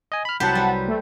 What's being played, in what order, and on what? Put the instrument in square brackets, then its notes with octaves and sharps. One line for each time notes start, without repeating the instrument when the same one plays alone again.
[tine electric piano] D#5 G#5
B5 F6
[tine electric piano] C2 F#3 [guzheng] G4 B4 C5 [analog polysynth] F#5 A5
[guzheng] G3
[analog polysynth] A3